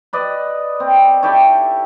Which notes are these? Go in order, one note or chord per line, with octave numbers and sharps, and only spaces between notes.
B4 D5 D#5
C4
E4 G4 A4 C#5